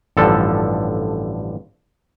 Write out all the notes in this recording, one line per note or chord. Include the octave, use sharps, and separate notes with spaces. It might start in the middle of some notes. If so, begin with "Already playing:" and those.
A1 G2 D3 F3 A4